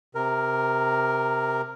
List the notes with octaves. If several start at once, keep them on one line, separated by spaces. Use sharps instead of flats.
C3 A#4